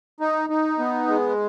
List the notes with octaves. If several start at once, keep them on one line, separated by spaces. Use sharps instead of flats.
D#4
D#4
B3
G#3